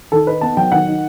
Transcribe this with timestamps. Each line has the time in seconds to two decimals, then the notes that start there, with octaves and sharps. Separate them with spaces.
0.12 D#3 A4
0.27 D#4 B4
0.41 B3 A5
0.57 F#3 G5
0.72 D#3 F#5
0.87 D#4